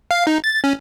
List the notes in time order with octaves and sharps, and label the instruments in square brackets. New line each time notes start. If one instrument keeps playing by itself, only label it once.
[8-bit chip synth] F5
D#4
A6
C#4